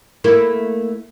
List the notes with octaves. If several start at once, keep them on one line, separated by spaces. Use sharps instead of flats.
A3 A#3 E4